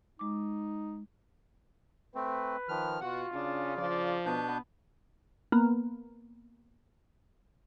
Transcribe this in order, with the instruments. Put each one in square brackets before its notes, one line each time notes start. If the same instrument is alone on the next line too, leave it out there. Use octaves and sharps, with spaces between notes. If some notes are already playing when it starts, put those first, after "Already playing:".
[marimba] G#3 D6 [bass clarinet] D#4
[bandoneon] A3 C4 [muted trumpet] B4
[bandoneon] D#3 F3 F6
[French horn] B2 [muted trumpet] F4 [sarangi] F#4 [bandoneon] F#5
[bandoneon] C#3 [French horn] C#4 [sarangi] D4
[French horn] F3 [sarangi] D5
[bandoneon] B2 D4 G6 [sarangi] B3
[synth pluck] A#3 B3